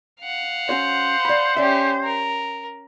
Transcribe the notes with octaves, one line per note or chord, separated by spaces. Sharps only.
F5 F#5
C#4 F#4 C5 C#5
D5 B5
C#4 G4 D5 E5
A#4